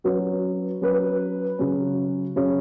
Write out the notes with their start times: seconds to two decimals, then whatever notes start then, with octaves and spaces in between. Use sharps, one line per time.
0.04 F#3 C#4 F#4 B4
0.82 F#3 C#4 F#4 B4
1.59 C#3 F#3 C#4
2.36 C#3 F#3 C#4